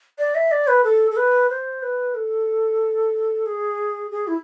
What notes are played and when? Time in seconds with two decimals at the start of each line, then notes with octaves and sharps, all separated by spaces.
0.18 D5
0.35 E5
0.51 D5
0.68 B4
0.84 A4
1.11 A4
1.17 B4
1.49 C5
1.82 B4
2.15 A4
3.46 G#4
4.11 G#4
4.27 E4